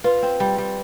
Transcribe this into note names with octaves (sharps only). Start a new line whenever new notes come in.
F4 B4
C4
G3
G3